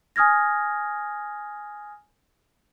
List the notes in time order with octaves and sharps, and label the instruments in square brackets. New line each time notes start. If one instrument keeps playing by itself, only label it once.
[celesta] G#5 D#6 F6 G#6 A#6